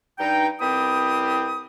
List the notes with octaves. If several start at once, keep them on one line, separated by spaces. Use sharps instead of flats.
G2 D#4 G5
C2 B3 C4 E4 G4 D#6